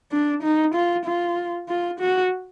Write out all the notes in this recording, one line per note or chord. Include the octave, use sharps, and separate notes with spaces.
D4
D#4
F4
F4
F4
F#4